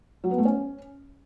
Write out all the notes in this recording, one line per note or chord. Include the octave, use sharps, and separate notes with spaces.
F#3
B3
A3
C#4